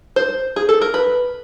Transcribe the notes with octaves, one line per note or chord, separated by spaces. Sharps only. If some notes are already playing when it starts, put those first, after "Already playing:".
C5
G#4
A4
A#4
B4